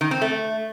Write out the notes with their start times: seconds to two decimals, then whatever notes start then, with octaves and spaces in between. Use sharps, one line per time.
0.01 D#3
0.11 C4
0.21 A3